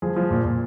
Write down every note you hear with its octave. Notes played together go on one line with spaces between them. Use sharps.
F3 G#4
F3
A#2
A#2